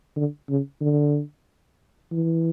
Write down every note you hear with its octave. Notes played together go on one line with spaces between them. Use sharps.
D3
C#3
D3
E3